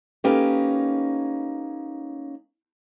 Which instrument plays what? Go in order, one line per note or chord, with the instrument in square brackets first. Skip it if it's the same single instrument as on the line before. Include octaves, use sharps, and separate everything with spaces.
[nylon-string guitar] A#3 C#4 D#4 G4 A4 B4